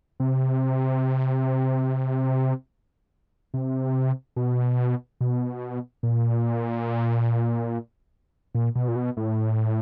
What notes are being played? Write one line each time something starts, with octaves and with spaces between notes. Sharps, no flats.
C3
C3
B2
B2
A#2
A#2
B2
A#2
B2
A2